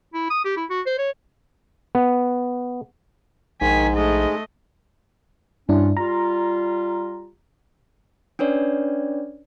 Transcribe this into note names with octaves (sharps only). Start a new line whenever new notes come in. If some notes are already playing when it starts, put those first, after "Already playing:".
E4
D#6
G4
E4
F#4
C5
C#5
B3
A#1 G#2 D#3 G#5 B6
G#3 A3 D#5
G2 F#3 C#4 D4 E4 F4
G3 F4 A#5
C#4 D4 B4 C#5 D5